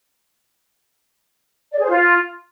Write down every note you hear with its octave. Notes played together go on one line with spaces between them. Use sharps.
D5
G#4
C5
F4